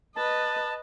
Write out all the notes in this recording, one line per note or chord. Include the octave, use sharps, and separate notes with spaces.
B4 D#5 A5